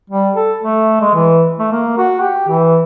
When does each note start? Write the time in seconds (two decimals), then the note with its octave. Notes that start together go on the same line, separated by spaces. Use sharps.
0.10 G3
0.36 A4
0.63 A3
1.01 G#3
1.14 E3
1.59 A3
1.72 A#3
1.98 F#4
2.20 G4
2.49 E3